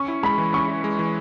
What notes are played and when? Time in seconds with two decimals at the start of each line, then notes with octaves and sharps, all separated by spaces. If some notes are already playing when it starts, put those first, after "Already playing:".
Already playing: C#4 C#6
0.08 E4
0.23 G#3 B5
0.38 E3
0.53 C#4 C#6
0.68 E4
0.84 G#3
0.99 E3